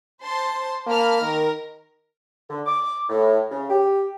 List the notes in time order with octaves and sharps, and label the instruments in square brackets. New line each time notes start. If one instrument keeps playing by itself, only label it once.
[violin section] C5 A5 C6
[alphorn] A#3 [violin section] A5 B5 F6
[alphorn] D#3 [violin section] A#4
[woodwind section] D3
D6
A2
C#3
G4